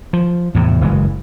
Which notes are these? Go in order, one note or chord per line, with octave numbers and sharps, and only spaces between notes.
F3
E2 A2 C3
F#1 E3 G#3